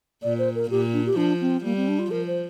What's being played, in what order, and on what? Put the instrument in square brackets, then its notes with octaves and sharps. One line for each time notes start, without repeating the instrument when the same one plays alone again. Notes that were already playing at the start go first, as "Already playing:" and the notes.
[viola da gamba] A#2 [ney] D5
[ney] C5
A#4
[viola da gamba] A#2 [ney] G4
[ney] D4
G4
[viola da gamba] F3 [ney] D4
[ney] C4
[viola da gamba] G3 [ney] A#3
[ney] C4
D4
F4
[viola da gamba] F3 [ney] A#4
[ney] C5